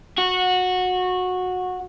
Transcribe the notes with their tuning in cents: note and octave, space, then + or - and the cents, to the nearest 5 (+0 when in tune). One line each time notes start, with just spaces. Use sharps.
F#4 -15